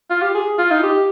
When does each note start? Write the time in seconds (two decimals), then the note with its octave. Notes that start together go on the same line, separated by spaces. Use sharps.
0.10 F4
0.22 G4
0.35 G#4
0.59 F4
0.71 D#4
0.83 G4